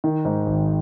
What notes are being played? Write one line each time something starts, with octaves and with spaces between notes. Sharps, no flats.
D#3
G#2
G#1